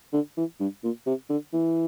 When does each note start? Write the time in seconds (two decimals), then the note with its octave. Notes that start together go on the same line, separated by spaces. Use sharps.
0.13 D3
0.37 E3
0.60 G2
0.84 A#2
1.07 C3
1.30 D3
1.53 E3